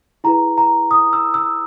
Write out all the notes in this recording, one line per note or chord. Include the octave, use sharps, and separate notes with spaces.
E4 G#4 B4 A#5
A#5
D#6
E6
E6